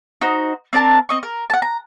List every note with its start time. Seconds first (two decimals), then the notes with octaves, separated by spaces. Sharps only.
0.21 D#4 F#4 C5
0.73 C4 D4 A#4 A5
1.09 C4 D#5 C#6
1.23 A#4
1.50 F#5 A5
1.62 A#5